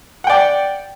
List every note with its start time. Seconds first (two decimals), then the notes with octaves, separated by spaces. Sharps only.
0.24 F#5
0.27 G5
0.30 D5